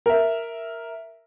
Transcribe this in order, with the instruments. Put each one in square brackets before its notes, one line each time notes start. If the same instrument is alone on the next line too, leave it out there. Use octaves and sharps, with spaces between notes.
[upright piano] A#4 E5